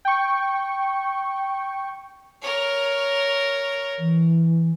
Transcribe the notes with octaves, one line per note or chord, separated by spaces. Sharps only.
G5 C#6
A#4 C#5
E3